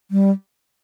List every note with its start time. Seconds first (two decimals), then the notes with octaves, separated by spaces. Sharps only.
0.11 G3